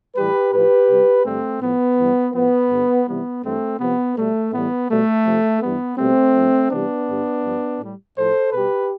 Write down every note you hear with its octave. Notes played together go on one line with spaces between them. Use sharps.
A2 E3 G3 G4 B4
A2 F3 G4 B4
C3 G3
G2 D3 G3 A3 C4
A2 F3 B3
G2 E3 G3
A2 F3 B3
G2 D3 G3
C3 E3 G3 B3
G2 E3 G3 A3 C4
C3 F3 B3
B2 G3 A3
A2 E3 G3 B3
B2 G3 A3
C3 F3
G2 E3 G3 B3
B2 G3 A3 C4
G2 F3
C3 E3 G3 B3 D4
G2 D3 G3
G2 F3
A2 G3
A2 F3 A4 C5
B2 G3 G4 B4